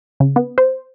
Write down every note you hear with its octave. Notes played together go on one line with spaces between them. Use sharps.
C#3
B3
C5